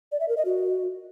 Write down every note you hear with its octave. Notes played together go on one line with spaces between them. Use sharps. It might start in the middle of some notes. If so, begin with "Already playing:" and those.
D5
E5
A#4
D#5
F#4